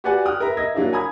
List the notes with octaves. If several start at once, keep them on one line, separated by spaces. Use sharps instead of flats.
F#4 G4 B4 D5 F#5 G#5
G5 D#6 F6 F#6
A#4 B4 E5 A#5
D#5 E5 G#6 A#6
F#3 A#3 D4 E4 F4
G#5 A#5 B5 D#6 G#6